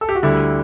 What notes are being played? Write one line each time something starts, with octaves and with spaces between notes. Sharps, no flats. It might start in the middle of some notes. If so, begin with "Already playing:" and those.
A4
G4
F#4
D2 D3 G3 E4